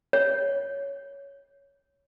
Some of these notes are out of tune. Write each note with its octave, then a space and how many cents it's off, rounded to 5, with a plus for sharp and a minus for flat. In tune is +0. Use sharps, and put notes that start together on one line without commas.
C#5 +5